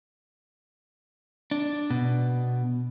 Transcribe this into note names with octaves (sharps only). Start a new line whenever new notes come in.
D4
B2